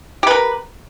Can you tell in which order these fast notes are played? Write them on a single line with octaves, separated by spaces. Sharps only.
G4 B4 A#4